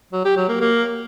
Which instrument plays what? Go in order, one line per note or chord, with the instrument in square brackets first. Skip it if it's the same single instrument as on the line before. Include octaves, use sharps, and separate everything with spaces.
[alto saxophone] F#3
G4
F#3
A#3
A#3